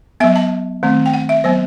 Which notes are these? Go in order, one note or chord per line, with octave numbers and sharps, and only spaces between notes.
F#3 B3 E5
A5
D#3 A3 C4
G5
F#5
E5
F#3 B3 C5